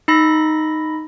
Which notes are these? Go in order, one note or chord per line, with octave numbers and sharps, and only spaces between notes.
D#4 B5 A#6